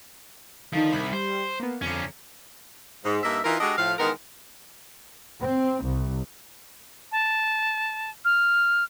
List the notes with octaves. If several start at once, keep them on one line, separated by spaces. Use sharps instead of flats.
D3 D#3 F3 D#4
C2 B5
G3 C5
A#3 B3
F2 D3 C#4 A#5
G#2
G2 A#3 D#4 E5
E3 D#4 F4 A#4
G#3 D4 F#4 G4 A4 D#5
A2 F3 F5
E2 D#3 G#3 B3 A#4
C4
C2
A5
F6